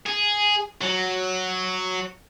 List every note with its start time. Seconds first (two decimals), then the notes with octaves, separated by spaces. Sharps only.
0.07 G#4
0.81 F#3